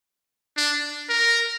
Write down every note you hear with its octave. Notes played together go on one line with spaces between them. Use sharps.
D4
A#4